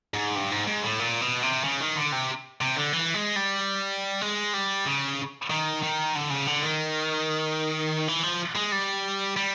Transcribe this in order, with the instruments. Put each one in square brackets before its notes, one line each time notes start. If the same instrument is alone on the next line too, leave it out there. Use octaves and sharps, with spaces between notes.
[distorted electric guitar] G#2
G2
G#2
G#2
A2
A#2
B2
C3
C#3
D#3
D3
C3
C3
D3
E3
G#3
G3
G#3
G3
C#3
D#3
D#3
D3
C#3
D3
D#3
E3
F3
G#3
G3
G3